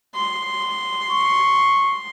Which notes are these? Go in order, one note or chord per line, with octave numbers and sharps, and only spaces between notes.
C6
C#6